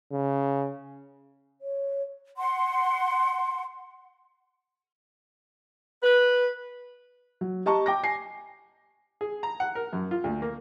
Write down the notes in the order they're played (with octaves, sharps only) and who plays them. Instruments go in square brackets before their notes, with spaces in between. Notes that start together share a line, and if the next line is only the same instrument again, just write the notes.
[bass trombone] C#3
[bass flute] C#5
[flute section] F#5 C6
[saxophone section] B4
[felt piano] F#3
G4 D#5 A5 A#5 C#6
G5 D6 A#6
G#5 C7
[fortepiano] G#4
A#5
F#5
A#4
F#2
F4
D2
A#3